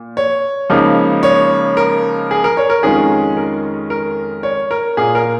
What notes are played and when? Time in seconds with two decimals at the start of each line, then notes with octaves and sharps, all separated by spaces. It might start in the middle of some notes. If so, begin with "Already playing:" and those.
Already playing: A#2
0.17 C#5
0.70 C#2 C#3 F3 A#3 D#4
1.23 C#5
1.77 A#4
2.31 G#4
2.44 A#4
2.57 C#5
2.70 A#4
2.83 F2 D#3 G#3 C#4 F4 G#4
3.37 A#4
3.90 A#4
4.43 C#5
4.71 A#4
4.97 A#2 A#3 F4 G#4
5.15 A#4